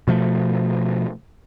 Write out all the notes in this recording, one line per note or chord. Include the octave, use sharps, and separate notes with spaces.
B2 F3 A3